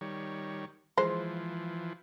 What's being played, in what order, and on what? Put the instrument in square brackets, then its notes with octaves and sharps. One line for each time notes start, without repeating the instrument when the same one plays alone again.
[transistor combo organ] D#3 G3 C#5
[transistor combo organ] E3 F3 [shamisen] G#3 C5